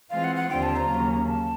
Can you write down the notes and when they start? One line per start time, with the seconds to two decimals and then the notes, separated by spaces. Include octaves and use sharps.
0.10 E3 G#3 C4 F4 F5
0.24 F#5
0.36 F#5
0.50 D#2 D3 G3 C4 F4 G5
0.63 A5
0.76 A#5
0.88 D#2 C#3 F#3 A#3
1.28 A5